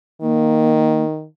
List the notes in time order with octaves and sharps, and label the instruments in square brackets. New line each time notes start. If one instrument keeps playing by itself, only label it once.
[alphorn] D#3 [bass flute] A#3